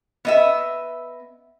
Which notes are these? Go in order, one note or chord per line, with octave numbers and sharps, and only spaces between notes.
B3 D#5 E5